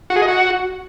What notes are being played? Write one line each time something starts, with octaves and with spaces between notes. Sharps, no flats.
F#4
G#4
D#5
F#4